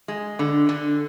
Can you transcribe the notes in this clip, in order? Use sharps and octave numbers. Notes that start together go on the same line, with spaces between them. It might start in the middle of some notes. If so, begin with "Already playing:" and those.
G#3
D3
D3